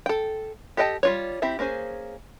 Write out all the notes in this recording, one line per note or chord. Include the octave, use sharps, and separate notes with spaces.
A4 G5
G4 A4 D#5 G5 A5
G3 F4 C#5
C4 E4 G4 E5
A#3 C#4 G#4 C5